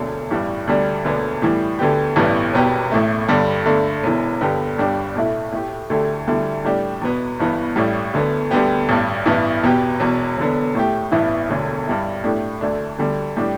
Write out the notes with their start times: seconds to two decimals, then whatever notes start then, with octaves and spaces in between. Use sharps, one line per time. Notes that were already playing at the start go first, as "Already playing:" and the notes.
Already playing: E1 D2 D3
0.31 A1 G2 E3 G3
0.67 D2 D3 G3 D4
1.05 E1 D2 D3 B3 D4
1.42 A2 E3 G3
1.79 D2 D3 B3 G4
2.16 A1 G2 E3 G3 B3
2.53 E1 E2 B2 B3 G4
2.92 A1 A2 A3
3.28 G2 D3 G3
3.66 G2 D3 A3 D4
4.03 E1 E2 E3
4.41 G2 D3 B3 G4
4.78 G1 G2 G3 D4 G4
5.15 B1 A2 A3 E4
5.52 A2 A3 G4
5.90 D2 D3 A3 G4
6.27 D2 D3 G3 E4
6.64 A2 G3 D4 G4
7.01 E2 B2 B3
7.39 G1 G2 E3 B3
7.76 A1 A2 G3
8.13 D2 D3 B3
8.51 D2 D3 G3 B3 G4
8.89 A1 G2 G3
9.26 A1 G2 E3 B3 E4
9.63 E2 B2 B3 G4
10.00 E1 E2 B2
10.37 E1 E2 D3 B3
10.75 A2 A3 G4
11.12 A1 G2 E3 B3 E4
11.49 E1 D2 D3
11.87 G2 G3 E4
12.24 A2 A3 D4 G4
12.61 D2 D3 A3 D4
12.98 D2 D3 G3
13.37 A2 G3 D4 G4